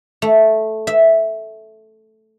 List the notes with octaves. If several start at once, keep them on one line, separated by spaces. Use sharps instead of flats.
A3
E5